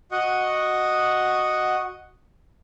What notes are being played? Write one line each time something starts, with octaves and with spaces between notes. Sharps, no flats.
F#4 D#5 F#5